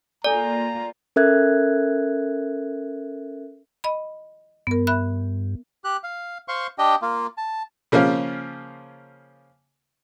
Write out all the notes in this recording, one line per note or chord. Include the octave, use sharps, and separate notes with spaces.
A#3 F4 A4 D5 G#5 A#5 D6
C#4 A4 A#4 E5 F#6 G#6
D#5 B5
G2 B3 A#4
E5 B5 F#6
G4 F#6
F5
C5 F5 C6 C#6
D4 G4 D#5 G5
A#3 F4
A5
C#3 F3 A#3 C#4 F4